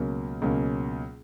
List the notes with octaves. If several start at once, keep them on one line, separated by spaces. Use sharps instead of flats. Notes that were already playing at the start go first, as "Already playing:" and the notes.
Already playing: C#2 B2 F#3 A#3 C#4
C#2 B2 F#3 A#3 C#4